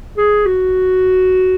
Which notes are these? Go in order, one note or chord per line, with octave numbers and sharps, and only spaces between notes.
G#4
F#4